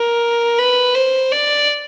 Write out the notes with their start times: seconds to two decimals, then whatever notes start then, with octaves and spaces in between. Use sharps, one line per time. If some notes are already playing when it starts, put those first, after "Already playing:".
Already playing: A#4
0.59 B4
0.95 C5
1.32 D5